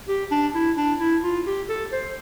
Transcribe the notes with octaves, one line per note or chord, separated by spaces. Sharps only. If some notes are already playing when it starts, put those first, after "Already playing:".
G4
D4
E4
D4
E4
F4
G4
A4
C5